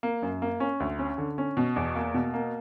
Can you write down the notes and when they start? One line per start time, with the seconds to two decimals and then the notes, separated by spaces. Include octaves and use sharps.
0.03 A#3
0.22 F#2
0.42 A#3
0.60 C#4
0.80 D2
0.99 C#4
1.18 D3
1.38 C#4
1.57 B2
1.76 E2
1.95 A#3
2.14 B2
2.34 A#3